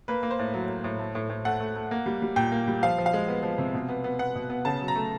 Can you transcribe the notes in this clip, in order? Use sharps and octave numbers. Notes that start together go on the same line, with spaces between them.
A#3 B4
A#3
C5
A2
F#3
A#3
A2
A3
A2
A2
A3 F#5
A3
A3
A#3
G3
G3
A#2 G5
A#3
G3
F3 F5
F3
F5
G#3
B3
F3
C3
B2
B3
B3
B3 F#5
B2
B3
C#3 A5
F#3
A#5
A3